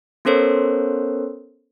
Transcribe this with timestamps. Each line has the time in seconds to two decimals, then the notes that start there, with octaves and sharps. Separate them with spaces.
0.25 B3 C#4 A4 A#4 C5 C#5